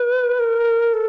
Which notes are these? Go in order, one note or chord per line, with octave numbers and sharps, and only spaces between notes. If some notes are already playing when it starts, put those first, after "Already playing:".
Already playing: B4
A#4
A4